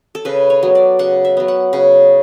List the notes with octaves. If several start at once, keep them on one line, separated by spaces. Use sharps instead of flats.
A4
C#3 B4
C#5
F#3 B3
D5
C#3 F#5
E5
F#3 B3
F#5
C#3 F#5